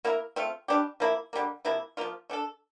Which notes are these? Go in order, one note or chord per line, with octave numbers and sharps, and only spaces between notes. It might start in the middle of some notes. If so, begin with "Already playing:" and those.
A#3 E4 A#4
A3 C4 F4
G3 D4 G4
F3 A#3 E4
D3 G3 A#3
C3 F3 A#3 E4
F3 A#3 F4
A3 D4 A4